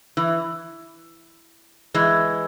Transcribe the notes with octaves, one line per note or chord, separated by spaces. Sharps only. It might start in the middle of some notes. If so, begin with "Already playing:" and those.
E3
E3 G#3